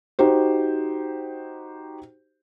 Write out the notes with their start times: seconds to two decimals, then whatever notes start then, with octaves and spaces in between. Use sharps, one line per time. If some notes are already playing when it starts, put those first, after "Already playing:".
0.19 D#4 F#4 G4 C5